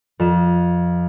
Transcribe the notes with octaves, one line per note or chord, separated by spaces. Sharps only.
F2 E7